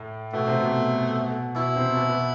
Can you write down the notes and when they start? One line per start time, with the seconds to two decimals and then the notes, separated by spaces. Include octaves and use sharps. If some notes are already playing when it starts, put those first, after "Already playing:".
Already playing: A2 A3
0.33 B2 A3 B3
0.47 C3 C4
0.61 B2 B3
1.55 B2 B3 E4
1.76 C3 C4
1.96 B2 B3
2.09 B2 B3